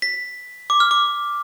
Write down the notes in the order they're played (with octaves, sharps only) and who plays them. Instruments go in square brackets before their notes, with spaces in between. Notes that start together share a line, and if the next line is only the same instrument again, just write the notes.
[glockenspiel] B6
D6
F6
D6